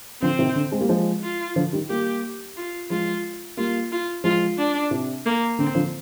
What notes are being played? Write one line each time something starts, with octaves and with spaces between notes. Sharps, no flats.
D3 F3 C4
C3 D#3
D3
G#3 C4
G3 A#3
F3 G#3
F4
D3 F3
D#3 G3
G3 A#3 G4
F4
F3 G#3 F4
G3 A#3 F4
F4
F3 G#3 F4
D4
C3
A#3
D3 C4
D3 F3